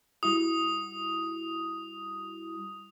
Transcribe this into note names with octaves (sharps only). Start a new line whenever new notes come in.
G3 E4 F#4 D#6